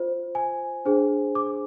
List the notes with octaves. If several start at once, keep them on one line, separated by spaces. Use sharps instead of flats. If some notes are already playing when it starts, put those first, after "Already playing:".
Already playing: F4 C5
G#5
D4 G#4 C5
D6